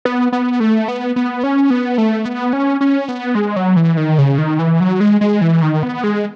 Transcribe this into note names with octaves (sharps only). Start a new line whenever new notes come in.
B3
B3
A3
B3
B3
C#4
B3
A3
B3
C#4
C#4
B3
G#3
F#3
E3
D#3
C#3
D#3
E3
F#3
G#3
G#3
E3
D#3
B3
G#3